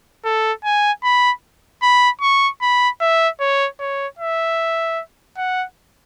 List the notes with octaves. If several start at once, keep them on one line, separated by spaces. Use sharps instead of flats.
A4
G#5
B5
B5
C#6
B5
E5
C#5
C#5
E5
F#5